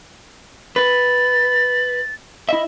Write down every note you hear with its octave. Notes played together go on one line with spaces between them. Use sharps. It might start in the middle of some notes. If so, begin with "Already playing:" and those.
B4 A6
E4 D#5 E5